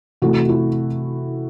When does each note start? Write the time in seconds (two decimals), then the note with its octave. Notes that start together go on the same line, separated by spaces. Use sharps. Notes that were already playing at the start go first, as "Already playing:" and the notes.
0.22 C3 E3 A3 F#4
0.49 E4